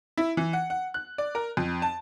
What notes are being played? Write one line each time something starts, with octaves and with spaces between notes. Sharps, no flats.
E4
E3
F#5
F#5
F#6
D5
A#4
F2
A5